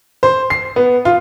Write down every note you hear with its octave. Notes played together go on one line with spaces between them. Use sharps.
C5
C7
B3
F4